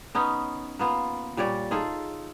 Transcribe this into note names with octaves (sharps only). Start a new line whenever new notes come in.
B3 C#4 D#4
A#3 B3 F4
A#2 G3 C#5 D5
D#4 F4 G#4 A4